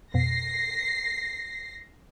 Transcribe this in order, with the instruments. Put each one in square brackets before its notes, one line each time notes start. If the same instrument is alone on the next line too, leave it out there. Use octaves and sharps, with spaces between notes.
[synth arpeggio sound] F2 B2 [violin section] A#6 C7